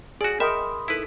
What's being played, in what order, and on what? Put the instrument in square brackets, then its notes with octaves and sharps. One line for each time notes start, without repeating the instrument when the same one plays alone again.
[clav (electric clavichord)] F#4 D5 [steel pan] G#4
[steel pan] A#4 D#5 G5 [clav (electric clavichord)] E5 [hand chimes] B5 C6 D#6
[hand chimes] D#4 A4 [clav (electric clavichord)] E4 B4